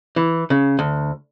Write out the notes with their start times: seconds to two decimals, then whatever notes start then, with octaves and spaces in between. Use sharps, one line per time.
0.16 E3
0.50 C#3
0.79 D2